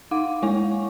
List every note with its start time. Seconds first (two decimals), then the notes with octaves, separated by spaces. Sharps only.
0.11 D#4 F5 F#5 D6
0.42 G#3 A#3 E4 C#5 G#5 C#6